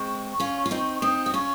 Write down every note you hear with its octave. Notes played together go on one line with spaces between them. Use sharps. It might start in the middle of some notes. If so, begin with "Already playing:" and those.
Already playing: G#3 C4 C#6
C#4 F4
F4
C4 D#4
C#6
C4 D#4 D#6
F#4
C#4 F4 C#6